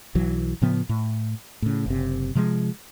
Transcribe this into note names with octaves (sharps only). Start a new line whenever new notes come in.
B1 E3 F#3
A2 C#3 F3 B3
A2
A2 C#3
F#1 C3
C3 F3 F#3 G#3